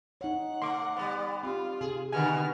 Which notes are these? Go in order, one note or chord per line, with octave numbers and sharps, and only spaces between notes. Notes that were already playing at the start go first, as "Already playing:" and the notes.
D#4 C#5 F#5
A3 C6 D6
G3 B3
C4 F4 G4
C3 G#4
B2 D3 D#3 B3 G#5 F6